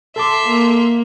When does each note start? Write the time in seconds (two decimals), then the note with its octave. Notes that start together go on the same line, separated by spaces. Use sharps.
0.16 A4 E5 A5 C6 D6
0.45 A#3